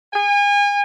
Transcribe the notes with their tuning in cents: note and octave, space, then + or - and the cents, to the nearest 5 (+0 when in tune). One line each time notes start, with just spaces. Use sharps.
G#5 -35